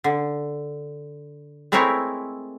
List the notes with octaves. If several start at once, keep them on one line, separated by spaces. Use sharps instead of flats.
D3
G#3 A3 C4 E4 A#4 C#5